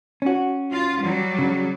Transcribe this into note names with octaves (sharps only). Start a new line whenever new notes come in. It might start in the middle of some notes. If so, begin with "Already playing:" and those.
C#4 F#4
F4
F#3 G3
C#3